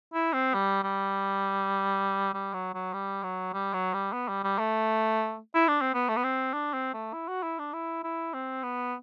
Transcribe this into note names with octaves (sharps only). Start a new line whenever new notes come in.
E4
C4
G3
G3
G3
F#3
F#3
G3
F#3
G3
F#3
G3
B3
G3
G3
A3
E4
D4
C4
B3
A3
B3
C4
D4
C4
A3
E4
F#4
E4
D4
E4
E4
C4
B3